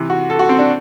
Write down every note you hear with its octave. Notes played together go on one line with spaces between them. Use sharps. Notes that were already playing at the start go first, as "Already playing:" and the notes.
Already playing: C3 E3
F#4
A4
F#4
C4
D4